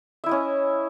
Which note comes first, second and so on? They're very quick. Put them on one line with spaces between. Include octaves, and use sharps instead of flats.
E5 E4 D#5 C#4